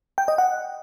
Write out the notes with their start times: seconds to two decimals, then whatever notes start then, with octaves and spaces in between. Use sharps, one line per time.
0.18 G5
0.28 D#5
0.38 F#5